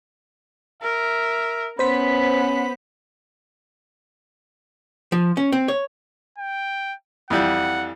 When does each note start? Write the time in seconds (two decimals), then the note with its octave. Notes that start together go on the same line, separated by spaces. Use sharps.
0.82 A#4 E5
1.79 B3 C#4 C5 B5 B6
5.12 F3
5.37 C#4
5.52 C4
5.68 C#5
6.38 G5
7.30 F2 E3 G3 F#5